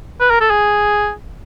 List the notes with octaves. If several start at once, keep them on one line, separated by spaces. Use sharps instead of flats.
B4
A#4
A4
G#4